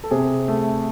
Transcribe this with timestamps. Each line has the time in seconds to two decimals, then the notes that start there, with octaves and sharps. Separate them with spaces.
0.04 A4
0.11 C3 G#4
0.48 A3